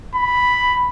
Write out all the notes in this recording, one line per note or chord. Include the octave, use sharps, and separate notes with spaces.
B5